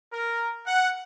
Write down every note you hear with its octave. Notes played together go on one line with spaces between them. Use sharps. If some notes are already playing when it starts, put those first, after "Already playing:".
A#4
F#5